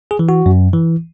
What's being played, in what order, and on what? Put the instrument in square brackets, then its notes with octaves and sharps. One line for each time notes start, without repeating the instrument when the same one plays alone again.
[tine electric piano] G#4
E3
F#4
F#2
E3